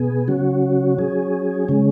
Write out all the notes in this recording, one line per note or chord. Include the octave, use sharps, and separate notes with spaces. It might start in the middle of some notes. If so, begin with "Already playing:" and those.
Already playing: B2 B3 G#4
C#3 F#3 C#4 F#4
F#3 C#4 G#4
C#3 G#3 C#4